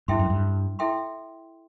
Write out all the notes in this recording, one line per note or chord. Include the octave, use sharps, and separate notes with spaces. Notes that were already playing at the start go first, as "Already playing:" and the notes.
G2 E4 A4 E5 G5 C6
F#2
G2
E4 A4 E5 G5 C6